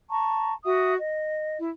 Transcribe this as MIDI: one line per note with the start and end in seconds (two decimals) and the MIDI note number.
0.10 0.53 81
0.10 0.53 82
0.10 0.53 85
0.65 0.94 66
0.65 0.94 76
0.65 0.94 78
0.65 0.94 87
0.98 1.58 75
1.59 1.69 64